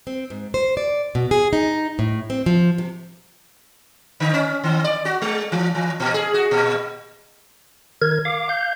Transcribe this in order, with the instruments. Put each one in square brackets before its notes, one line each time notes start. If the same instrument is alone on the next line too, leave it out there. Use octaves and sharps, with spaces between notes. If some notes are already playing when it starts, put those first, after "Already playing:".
[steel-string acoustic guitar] C4
G#2
C5
D5
B2
G#4
D#4
A2
C4
F3
C3
[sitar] D3
C#4
D#3
D5
F#4
G#3
E3
E3
A#2
G#4
F#4
A#2
[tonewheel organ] D#3 A#4 G#6
F5 D6
F5 G6